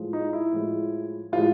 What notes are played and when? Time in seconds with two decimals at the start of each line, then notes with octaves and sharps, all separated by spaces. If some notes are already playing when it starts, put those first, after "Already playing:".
Already playing: A2 F3 G#3
0.13 D#4
0.33 E4
0.53 A2 F3 G#3
1.32 A2 F3 G#3 F4